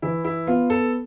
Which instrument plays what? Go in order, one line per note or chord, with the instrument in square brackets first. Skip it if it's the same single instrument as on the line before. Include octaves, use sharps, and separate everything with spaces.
[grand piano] E3 [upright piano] E4
[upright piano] E4
[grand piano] B3 [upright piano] F4
[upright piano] A4